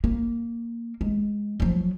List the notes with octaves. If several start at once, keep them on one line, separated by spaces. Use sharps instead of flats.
A#3
G#3
F3 F#3